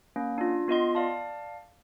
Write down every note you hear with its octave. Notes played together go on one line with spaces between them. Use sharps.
A#3 C#4
D4 F4
B3 F4 D#5 C6
D5 F5 A5